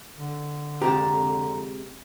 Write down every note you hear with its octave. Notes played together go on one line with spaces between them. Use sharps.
D3
F2 C3 G#3 G4 A5 A#5